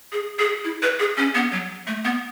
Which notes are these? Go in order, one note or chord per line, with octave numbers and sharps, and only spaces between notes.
G#4
G#4
E4
B4
G#4
C#4
B3
F#3
A3
B3